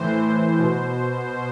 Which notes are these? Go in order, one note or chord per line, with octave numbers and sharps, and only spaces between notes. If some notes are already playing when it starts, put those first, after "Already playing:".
Already playing: A2 E3 C5
B2